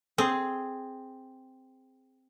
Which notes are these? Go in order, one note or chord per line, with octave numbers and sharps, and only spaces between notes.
C4 G#4